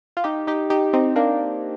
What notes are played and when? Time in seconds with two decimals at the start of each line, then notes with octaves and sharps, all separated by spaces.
0.17 F4
0.24 D#4 G4
0.47 D#4 G4
0.70 D#4 G4
0.93 C4 D#4
1.16 A#3 D4